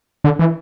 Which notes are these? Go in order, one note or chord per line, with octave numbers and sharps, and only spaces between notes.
D3
E3